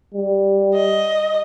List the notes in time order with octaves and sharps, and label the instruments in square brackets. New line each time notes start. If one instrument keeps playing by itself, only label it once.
[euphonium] G3
[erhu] D#5